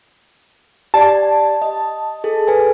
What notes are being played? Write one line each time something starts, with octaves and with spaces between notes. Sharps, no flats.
G4 D5 A5
D#5
G#4 A4
A4 B4 G#5